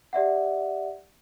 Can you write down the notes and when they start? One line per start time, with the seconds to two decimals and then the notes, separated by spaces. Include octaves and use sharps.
0.13 G4 D5 E5 F#5